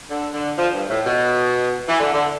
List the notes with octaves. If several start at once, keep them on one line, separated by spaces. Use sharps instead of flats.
D3
D3
F3
G2
A2
B2
E3
D3
D3